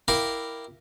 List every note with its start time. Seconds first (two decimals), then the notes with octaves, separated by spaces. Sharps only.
0.08 E4 G4 A#4 F5